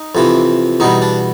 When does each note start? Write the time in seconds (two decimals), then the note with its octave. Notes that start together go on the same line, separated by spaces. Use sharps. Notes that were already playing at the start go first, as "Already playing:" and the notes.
Already playing: D#4
0.15 F2 C3 E3
0.80 E2 B2 G3 D#4
1.02 D4